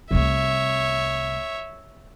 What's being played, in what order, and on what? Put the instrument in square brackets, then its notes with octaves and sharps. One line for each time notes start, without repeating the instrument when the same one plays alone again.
[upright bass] C2 A3 [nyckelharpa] C#5 E5